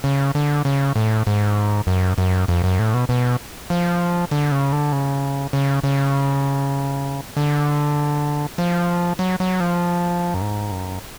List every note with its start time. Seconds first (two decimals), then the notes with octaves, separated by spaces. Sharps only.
0.04 C#3
0.35 D3
0.65 C#3
0.96 A2
1.27 G#2
1.87 F#2
2.18 F#2
2.48 F2
2.64 F#2
2.79 A2
2.94 B2
3.09 B2
3.70 F3
4.31 D3
4.51 C#3
4.72 D3
4.92 C#3
5.53 C#3
5.84 C#3
7.37 D3
8.58 F3
9.19 F#3
9.40 F#3
9.60 F3
10.34 F#2
10.41 G#2
10.71 F#2